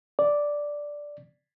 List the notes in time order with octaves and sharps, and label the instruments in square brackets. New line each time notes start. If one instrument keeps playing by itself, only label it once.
[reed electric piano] D5